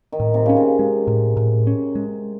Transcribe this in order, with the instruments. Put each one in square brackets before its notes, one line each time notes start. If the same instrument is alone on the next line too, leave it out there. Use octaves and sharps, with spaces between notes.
[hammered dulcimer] D#3
[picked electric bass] A2
[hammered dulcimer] C3
[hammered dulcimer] C#3 [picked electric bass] C#4
[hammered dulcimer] C3
[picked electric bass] G#3
A2
A2
C#4
G#3